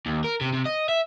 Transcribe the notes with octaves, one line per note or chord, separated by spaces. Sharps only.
D#2
A#4
C3
C3
D#5
E5